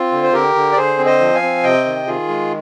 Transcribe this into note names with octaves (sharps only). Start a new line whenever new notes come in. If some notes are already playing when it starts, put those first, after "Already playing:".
Already playing: C4 F4
D3
C5
D3 G4 A#4
D3
D5
D3 G#4 C5
C4
C5 D#5
F3
F5 G#5
C4
C3 D#5 G5
D#3
D#3 F4 G#4
G#3